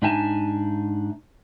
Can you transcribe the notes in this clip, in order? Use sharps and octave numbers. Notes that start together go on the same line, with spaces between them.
G#2 D4 D#4 E5 G#5 A5